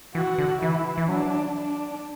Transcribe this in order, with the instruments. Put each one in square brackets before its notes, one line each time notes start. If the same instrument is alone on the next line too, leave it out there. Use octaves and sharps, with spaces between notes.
[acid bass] E3 [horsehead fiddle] F#4
[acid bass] D3
[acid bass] E3 [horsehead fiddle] E4
[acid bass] E3
[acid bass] F#3 [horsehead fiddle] D4
[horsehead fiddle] D4